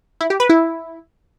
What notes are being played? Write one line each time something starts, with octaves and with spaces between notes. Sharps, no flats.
E4
G4
B4
E4